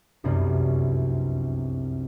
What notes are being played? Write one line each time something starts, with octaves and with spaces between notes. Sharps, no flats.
F1 C2 F#2 B3 C4 D4